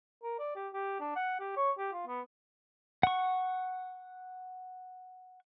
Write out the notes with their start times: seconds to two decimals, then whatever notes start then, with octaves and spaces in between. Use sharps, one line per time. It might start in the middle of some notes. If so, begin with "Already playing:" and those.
0.23 A#4
0.39 D5
0.56 G4
0.74 G4
1.00 D4
1.16 F#5
1.40 G4
1.57 C#5
1.78 G4
1.93 F4
2.07 B3
3.03 F#5 C#6